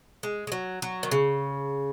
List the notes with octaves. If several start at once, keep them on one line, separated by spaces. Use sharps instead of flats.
G#3
G#3
F#3
F#3
D#3
C#3